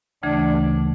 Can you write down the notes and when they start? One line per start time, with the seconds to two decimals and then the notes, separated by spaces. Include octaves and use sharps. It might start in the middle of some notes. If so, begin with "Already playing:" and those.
0.23 D2 C#3 E3 A3 D4